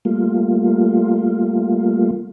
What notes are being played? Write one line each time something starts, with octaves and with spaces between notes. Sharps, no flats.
G3 A3 A#3 F4